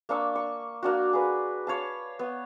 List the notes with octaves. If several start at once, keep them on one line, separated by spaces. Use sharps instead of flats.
A#3 D4 C#6 E6
C#6
A#3 D4 F#4
G#4 B4
C#5 F5 A5
B3